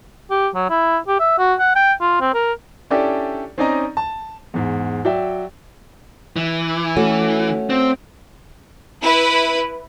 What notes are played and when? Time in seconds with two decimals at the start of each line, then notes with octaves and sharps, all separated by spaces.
0.31 G4
0.55 F#3
0.70 E4
1.08 G4
1.19 E5
1.38 F#4
1.60 F#5
1.76 G5
2.01 F4
2.21 C4
2.34 A#4
2.90 C#4 D4 E4 G4 A4 D5
3.58 C4 C#4 D#4 D5 D#5 A#5
3.97 A5
4.54 E2 G#2
5.05 F#3 D5 E5 G5
6.36 E3
6.96 A3 C#4 F#4
7.70 C4
9.02 E4 B4